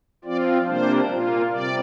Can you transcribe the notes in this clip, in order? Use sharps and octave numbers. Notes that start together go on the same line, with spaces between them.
F3 C4 F4 D5
C3 G3 A#3 D4 C5
A#2 A#3 F4
C3 G3 D5